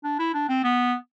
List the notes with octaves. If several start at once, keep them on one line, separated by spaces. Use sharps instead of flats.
D4
E4
D4
C4
B3